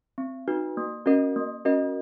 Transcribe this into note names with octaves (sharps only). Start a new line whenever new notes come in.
C4
D#4 F#4 B4
A#3
C#4 F#4 A#4 D#5
A#3
C#4 F#4 A#4 D#5